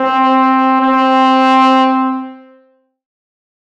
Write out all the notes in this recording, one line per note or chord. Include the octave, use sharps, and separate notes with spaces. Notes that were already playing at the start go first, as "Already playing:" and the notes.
Already playing: C4
C4